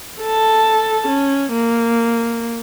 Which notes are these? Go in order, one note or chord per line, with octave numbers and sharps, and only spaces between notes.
A4 A5
C#4
A#3